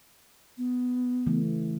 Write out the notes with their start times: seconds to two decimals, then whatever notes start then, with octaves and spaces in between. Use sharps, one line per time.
0.58 B3
1.26 C#3 E3 A3